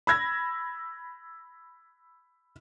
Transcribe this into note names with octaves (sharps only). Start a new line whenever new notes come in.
B5 E6 G#6 A#6